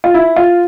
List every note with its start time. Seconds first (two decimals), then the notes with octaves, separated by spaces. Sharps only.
0.04 F4
0.14 E4
0.36 F4